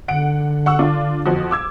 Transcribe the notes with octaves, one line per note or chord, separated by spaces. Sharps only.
D3 F#5 D7
F#5 C#6 E6
D4 F4
F2 F3 F#4
D6 E6 G#6